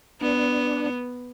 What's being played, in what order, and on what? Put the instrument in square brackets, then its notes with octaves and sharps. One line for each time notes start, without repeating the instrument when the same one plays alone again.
[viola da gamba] B3 [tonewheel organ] D4